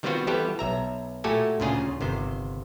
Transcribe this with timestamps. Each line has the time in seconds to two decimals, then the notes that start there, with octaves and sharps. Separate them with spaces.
0.03 D#3 G3 B3 C4 F4 F#4
0.27 E3 G3 B3 G4 A4
0.59 B1 E5 A#5
1.24 A#2 A3 F#4 G4 A4 G#5
1.60 D2 A#2 C#3 F4 G#4
2.01 G1 C3 D#3 C5